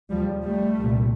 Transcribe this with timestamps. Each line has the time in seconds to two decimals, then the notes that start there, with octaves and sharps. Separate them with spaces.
0.10 D#2 C#3 F3 G3
0.44 G3 A3
0.78 C2 A#2